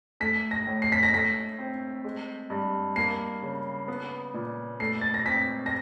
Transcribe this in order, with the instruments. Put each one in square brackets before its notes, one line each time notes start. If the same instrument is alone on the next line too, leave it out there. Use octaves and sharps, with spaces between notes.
[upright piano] A3 B6
A#6
A2
C7
B6
A#6
A3 B6
C4
G#3
G2
A#3 C7
C#3
B3
A#2
A3 C7
A6
A#6
C4 B6
A#6